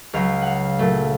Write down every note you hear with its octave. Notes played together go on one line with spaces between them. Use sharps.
C#2 C#3 F#3 F5
F5 F#5
A#2 F#3 A3